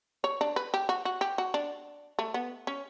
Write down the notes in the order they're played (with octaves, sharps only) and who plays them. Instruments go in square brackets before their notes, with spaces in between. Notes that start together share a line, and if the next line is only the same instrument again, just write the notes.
[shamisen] C#5
D4
B4
G4
F#4
F#4
G4
F#4
D4
A3
B3
C#4